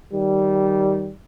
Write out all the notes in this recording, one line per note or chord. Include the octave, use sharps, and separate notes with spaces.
D#3 G3